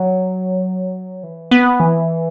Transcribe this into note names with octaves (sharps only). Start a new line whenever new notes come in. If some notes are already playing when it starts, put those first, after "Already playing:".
Already playing: F#3
E3
B3
E3